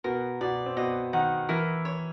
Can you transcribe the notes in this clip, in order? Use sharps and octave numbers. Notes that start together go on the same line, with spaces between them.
B2 B3 A#4
B2 B3 D5
C4
B2 B3 D#5
D#3 D#4 F#5
E3 E4 A#4
C#5